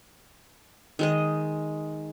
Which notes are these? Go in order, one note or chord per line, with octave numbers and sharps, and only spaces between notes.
D#3 G#3 D#5